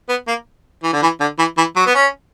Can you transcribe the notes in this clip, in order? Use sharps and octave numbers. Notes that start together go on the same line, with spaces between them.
B3
A#3
E3
D3
E3
D3
E3
E3
F#3
B3
C#4